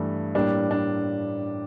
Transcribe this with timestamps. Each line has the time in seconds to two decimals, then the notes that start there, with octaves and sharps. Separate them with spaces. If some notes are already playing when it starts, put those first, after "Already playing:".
Already playing: G2 E3 A3
0.35 A2 G3 A#3 D4
0.71 D4